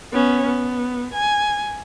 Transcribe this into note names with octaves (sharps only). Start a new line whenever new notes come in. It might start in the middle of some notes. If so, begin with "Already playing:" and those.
B3 C#4
B3
G#5